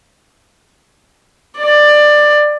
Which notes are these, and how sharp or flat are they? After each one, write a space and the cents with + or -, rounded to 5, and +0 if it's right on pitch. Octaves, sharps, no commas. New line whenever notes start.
D5 +15